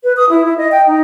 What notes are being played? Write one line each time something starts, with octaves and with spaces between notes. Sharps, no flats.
B4
D#6
E4
E4
D#5
G5
D#4